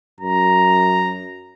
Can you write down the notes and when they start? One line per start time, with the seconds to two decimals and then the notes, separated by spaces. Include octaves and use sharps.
0.21 F#2 A#5